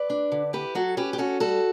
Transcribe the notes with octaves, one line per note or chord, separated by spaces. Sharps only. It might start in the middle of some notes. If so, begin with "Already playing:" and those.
Already playing: B4 D5
D4
D3
E4 G4 B4
F#3 F#4 A4
C#4 G4 B4
G4
C#4 F#4 A4
G3 F#4 A4